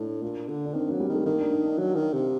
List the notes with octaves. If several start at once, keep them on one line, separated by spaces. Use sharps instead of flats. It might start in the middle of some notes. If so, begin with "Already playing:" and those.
Already playing: A2 D4
A#2
D3
D4
D#3 C4
F#3 A#3
G3
D#3 A3
D#3 A#3
D4
D#4
D4
F#3
D#3
C3